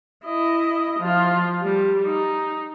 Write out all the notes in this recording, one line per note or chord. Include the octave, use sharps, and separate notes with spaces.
E4 D#5
F3 F4
G3
D#4